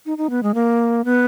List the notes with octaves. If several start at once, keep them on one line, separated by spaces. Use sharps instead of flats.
D#4
D#4
B3
G#3
A#3
B3